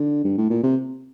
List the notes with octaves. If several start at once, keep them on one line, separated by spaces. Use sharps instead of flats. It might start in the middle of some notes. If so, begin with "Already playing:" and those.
Already playing: D3
G2
A2
A#2
C3